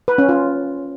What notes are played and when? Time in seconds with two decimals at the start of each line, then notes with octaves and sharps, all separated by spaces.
0.08 B4
0.18 C#4
0.29 F4